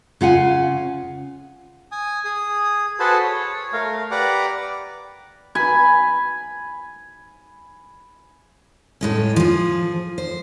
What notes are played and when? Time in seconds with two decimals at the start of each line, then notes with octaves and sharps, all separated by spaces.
0.21 C#3 F4 F#5 G#5
1.92 G#5 D#6
2.24 G#4 D#6
3.00 F#4 G#4 A4 B4 C5 A5
3.23 C#5
3.73 A3 A#4 F5
4.11 G4 B4 D5 F#5 A#5 D6
5.55 G#5 B5
9.01 A2 G#3 C#4
9.36 F3 G#4
10.18 C5